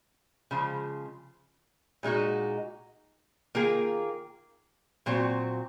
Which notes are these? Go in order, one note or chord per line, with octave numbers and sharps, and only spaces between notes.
C#3 F3 G#3
A#2 G#3 D#4 F#4
D#3 A#3 F4 G#4
A#2 F#3 C4 F#4